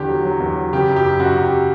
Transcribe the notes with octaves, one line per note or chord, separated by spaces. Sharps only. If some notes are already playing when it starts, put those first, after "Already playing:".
Already playing: E2 D3 G4
F#3
F#3
E2
F#3
C#3 G4
F#2
G4
F#2
F#2 F#4
F#2
G4